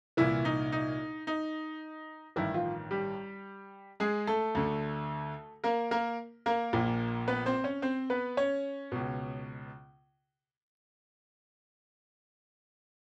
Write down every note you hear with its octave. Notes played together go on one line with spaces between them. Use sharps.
C2 A#2 E3 E4
D#4
D#4
D#4
A1 G2 D#3 E3 E4
F3 F4
G3 G4
G#3 G#4
A3 A4
D2 D3
A#3 A#4
A#3 A#4
A#3 A#4
A#1 A#2
B3 B4
C4 C5
C#4 C#5
C4 C5
B3 B4
C#4 C#5
C#2 B2